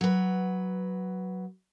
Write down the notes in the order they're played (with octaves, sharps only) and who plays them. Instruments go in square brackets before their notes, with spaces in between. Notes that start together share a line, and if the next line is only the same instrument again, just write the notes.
[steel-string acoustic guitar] F#3 B4